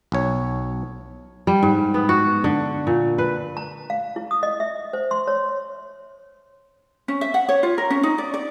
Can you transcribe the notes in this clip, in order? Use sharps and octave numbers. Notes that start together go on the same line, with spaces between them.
B1 C#5
G3
G#2
B3
F#4
D3
A#2
B4
A#5
F5
E4
D#6
D#5
E5
C5
C6
C#5
C#4
E5
F#5
C#5
F4
A#4
C#4
D#4
D5
D5